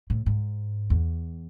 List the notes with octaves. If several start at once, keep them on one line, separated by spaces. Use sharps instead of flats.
A2
G#2
E2